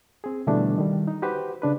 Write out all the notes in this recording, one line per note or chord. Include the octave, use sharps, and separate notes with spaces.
C4 G#4
B2 D3 E3 G3 A3 D4
D#3 G3
D#4
F#4 G4 B4 C5
C#3 D4 B4